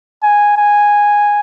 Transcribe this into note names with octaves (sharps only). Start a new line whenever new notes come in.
G#5
G#5